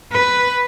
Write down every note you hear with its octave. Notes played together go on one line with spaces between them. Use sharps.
B4